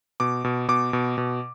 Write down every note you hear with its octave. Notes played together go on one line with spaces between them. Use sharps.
B2 D6
B2
B2 D6
B2
B2